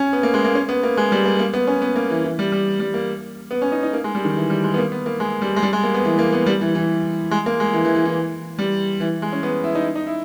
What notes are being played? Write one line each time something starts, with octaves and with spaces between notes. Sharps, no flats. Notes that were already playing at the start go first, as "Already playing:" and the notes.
Already playing: C#4
B3
A#3
G#3
A#3
C#4
B3
A#3
G#3
G3
A#3
A#3
B3
C#4
B3
A#3
E3
E3
G3
G3
G3
A#3
B3
C#4
D#4
D#4
A#3
G#3
G3
D#3
E3
G3
G#3
B3
A#3
B3
A#3
G#3
G3
G#3
G3
G#3
A#3
B3
E3
A#3
B3
G3
E3
E3
G#3
A#3
G#3
E3
E3
E3
E3
G3
E3
G#3
C#4
B3
E4
D#4
D#4
E4